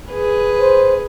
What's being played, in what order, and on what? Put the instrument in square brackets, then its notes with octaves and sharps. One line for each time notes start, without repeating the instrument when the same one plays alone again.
[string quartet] G#4 B4
[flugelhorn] C5